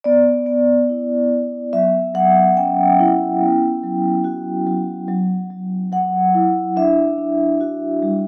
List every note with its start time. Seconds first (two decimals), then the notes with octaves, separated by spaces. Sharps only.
0.04 B3 D5
0.46 B3
0.89 E4
1.31 B3
1.73 F#3 E5
2.14 F#3 F#5
2.57 C#4 G5
2.99 E4
3.41 B3
3.83 F#3
4.24 F#4
4.67 F#3
5.08 F#3
5.51 F#3
5.92 F#3 F#5
6.35 E4
6.76 D4 E5
7.18 D4
7.61 F#4
8.03 G3